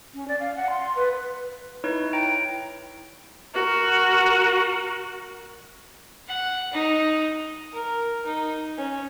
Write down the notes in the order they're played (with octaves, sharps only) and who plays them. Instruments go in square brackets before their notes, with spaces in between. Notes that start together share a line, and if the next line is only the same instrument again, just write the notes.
[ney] C#4
D5
F5
F#5
C6
B4
[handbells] D#4 E4 B4 C#5
E4 G5 A#5 D7
[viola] F#4 A#4
[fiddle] F#5
D#4
[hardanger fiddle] A#4
D#4
C#4